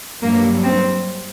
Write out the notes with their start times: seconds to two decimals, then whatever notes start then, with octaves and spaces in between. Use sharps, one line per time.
0.23 G2 F#3 A#3
0.64 C4